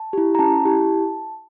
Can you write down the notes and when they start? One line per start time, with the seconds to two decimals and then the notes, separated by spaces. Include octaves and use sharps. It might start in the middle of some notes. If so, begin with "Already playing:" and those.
Already playing: A5
0.13 E4 G4
0.35 A#5
0.39 C#4 A5
0.65 E4 G4